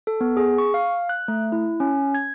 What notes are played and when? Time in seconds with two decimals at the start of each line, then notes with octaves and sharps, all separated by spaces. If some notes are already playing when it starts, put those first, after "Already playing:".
0.07 A4
0.21 B3
0.37 G#4
0.58 C#6
0.74 F5
1.09 F#6
1.28 A3
1.52 E4
1.80 C#4
2.15 G#6